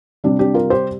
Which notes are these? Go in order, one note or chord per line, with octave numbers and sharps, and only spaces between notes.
C3 G3 D4
D4 G4
F4 A#4
G4 C5